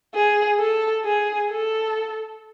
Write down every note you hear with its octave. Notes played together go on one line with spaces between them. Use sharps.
G#4
A4
G#4
A4